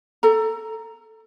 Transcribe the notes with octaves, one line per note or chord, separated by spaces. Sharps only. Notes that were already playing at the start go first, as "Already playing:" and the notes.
A4 A#5